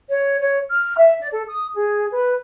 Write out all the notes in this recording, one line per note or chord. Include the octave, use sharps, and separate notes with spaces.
C#5
C#5
F6
E5
D5
A4
D#6
G#4
B4